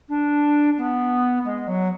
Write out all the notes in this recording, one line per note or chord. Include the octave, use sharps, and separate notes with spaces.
D4
B3
G#3
F#3